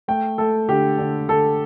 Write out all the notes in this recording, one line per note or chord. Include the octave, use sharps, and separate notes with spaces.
A3 G5
A3 A4
D3 G4
D3
D3 A4